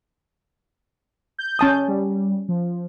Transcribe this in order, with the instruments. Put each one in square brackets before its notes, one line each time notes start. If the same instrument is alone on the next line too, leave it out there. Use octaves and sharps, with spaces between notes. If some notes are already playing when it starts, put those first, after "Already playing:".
[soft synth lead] G6
[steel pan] C#4 A5 D#6
[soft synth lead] G3
F3